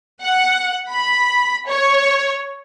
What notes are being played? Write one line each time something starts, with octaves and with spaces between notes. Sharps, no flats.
F#5
B5
C#5